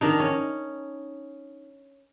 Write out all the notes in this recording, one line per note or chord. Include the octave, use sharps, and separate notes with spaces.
D#3 D4 D#4
C#4